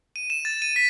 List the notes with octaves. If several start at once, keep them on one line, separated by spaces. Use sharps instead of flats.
D#7
E7
A6
D#7
B6